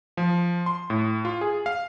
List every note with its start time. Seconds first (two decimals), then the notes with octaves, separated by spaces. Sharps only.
0.17 F3
0.66 C6
0.90 A2
1.25 F4
1.41 G#4
1.66 F5